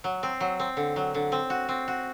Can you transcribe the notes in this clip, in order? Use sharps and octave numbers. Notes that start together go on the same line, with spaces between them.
F#3
C4
F#3
C4
D3
F#3
D3
C4
F#4
C4
F#4